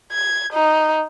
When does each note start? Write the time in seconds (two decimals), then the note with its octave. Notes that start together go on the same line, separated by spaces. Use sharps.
0.12 G#6
0.53 D#4